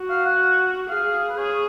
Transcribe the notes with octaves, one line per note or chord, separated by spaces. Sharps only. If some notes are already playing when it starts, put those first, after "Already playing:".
Already playing: F#4
F5
F#5
G#4 F5
B4
G#4 C#5